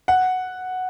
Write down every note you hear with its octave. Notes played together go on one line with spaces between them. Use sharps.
F#5